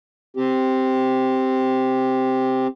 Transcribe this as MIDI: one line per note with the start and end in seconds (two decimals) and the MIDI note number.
0.37 2.67 60
0.37 2.67 67